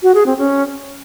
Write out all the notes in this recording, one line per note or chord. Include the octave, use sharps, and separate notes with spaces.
F#4
G#4
C4
C#4